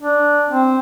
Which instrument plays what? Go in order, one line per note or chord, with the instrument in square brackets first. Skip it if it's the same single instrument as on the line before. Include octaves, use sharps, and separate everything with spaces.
[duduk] D4
C4